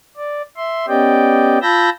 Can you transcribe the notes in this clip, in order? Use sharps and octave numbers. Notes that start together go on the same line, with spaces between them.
D5
E5 C6
B3 C#4 G4 D5 D#5 G5
F4 A5 B5 E6 G6 A#6